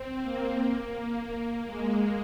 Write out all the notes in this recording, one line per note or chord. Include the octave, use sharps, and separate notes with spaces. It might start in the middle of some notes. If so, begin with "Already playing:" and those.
Already playing: C4
A#3
G#3